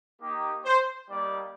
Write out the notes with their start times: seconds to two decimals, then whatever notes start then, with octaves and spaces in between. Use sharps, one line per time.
0.22 A#3 D#4 G4
0.65 C5
1.09 G3 A#3 D#4 G4 D5